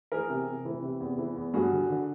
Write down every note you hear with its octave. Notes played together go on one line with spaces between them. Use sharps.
E3 G#4 A#4
C3
C3
E3
C3
E2
E3
E2
G2 F#4 G#4
D3
D3